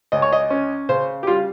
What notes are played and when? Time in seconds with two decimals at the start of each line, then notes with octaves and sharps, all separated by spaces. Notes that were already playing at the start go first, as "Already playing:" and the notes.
0.12 C#2 D#5
0.22 C#5
0.33 D#5
0.50 C#4
0.89 C#3 C5
1.23 G4
1.27 G3 F4